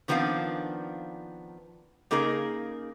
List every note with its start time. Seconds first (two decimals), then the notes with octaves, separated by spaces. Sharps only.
0.08 D#3 F3 B3 C4 D4 F5
2.11 C#3 A#3 D#4 G#4 A#4